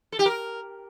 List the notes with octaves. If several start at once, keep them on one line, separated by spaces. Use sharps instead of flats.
A4
G4
A#4